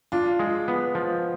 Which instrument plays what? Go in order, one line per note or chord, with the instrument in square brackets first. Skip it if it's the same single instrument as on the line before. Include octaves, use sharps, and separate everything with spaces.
[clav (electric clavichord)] D4 [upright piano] F4
[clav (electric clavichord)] G#3
B3
F3